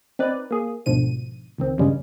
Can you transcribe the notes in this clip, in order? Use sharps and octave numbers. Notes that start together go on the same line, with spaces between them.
C4 D#4 B4 D5
A#3 G#4
D2 G#2 B2 D3 F3 D#7
C#2 D#3 C4
E2 G2 C#3 G3 G#3 C#4